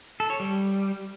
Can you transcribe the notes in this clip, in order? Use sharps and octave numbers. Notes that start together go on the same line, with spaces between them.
A4
C#5
G3